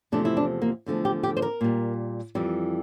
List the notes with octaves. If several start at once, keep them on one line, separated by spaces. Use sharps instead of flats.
E2 C3 F3 A3 D4
E4
D4
A#3
E2 D3 F3 A3
G4
G4
C5
A#4
A#2 G3
F2 E3 G3